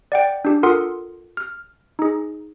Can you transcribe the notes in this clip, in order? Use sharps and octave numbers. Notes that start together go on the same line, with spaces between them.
D5 F#5 G5
D4 G4
F4 A4 A#4 F#5 C6 D#6
F6
D#4 G#4